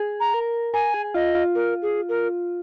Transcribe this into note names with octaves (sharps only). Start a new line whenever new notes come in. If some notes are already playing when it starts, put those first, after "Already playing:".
Already playing: G#4
A#5
A#4
A#4 G#5
G#4
F4 D#5
F4
A#4
G#4
A#4